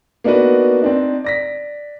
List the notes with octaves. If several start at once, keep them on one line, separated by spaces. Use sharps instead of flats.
A#3 B3 D4 D#4 F#4 B4
C4 D4 D#4
D5 A#6 B6